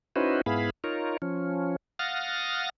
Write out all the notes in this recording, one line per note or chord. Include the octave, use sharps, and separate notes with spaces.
C#4 D#4 E4 F#4 B4 C5
G#2 B3 E4 G#4 F5 B5
D#4 F4 A#4 C#5
F3 C#4
F5 F#5 D#6 F6 A6 A#6